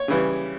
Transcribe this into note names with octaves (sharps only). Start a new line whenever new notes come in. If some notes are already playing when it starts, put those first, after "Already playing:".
Already playing: C#5
C#3 E3 G3